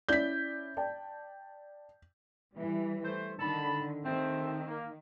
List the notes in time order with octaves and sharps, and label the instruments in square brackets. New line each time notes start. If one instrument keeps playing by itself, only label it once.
[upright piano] C#4 E4 D5 [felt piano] G6 B6
[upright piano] D5 G5 A5
[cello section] E3 G3
[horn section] A3 C5
[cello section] D3 D#3 [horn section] A5 B5
[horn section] C3 A3 C4 [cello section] D#3
[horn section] A#3